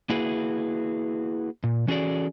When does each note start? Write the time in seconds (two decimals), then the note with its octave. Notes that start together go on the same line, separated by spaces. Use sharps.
0.09 A#3 E4 F#4 G#4 B4
1.64 A#2
1.88 E3 C#4 F#4 G#4 A4 D5